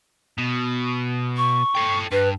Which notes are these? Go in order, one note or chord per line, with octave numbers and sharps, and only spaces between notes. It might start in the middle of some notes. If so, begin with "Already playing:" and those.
B2
C#6
A4 G5
G2 B4